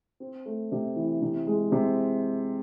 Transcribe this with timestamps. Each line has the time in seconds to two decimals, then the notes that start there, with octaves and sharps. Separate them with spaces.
0.20 C4
0.46 A3
0.72 C3
0.96 E3
1.22 C3
1.47 G#3
1.72 C3